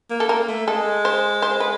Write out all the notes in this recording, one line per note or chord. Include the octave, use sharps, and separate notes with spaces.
A#3
A4
A#3 A#4
A3
G#3 A4
C5
C5
B4